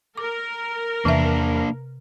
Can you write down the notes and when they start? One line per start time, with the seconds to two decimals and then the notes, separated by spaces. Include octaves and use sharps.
0.17 A#4 D6
1.05 E2 C3 A#3 D4 E5